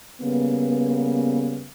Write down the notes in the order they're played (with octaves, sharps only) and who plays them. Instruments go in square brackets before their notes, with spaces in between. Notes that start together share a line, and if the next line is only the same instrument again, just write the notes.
[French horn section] C#3 G3 A#3 B3